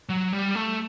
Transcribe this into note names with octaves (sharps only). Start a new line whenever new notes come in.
F#3
G3
A3